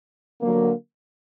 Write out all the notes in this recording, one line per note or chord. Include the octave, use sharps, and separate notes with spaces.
D3 F#3 A#3